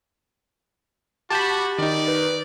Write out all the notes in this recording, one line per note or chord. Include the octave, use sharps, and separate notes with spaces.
F#4 G4 A5 B5 D6 G6
D#3 D#4 D5
B4